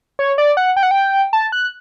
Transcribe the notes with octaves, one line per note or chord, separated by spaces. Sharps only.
C#5
D5
F#5
G5
F#5
G5
A5
F#6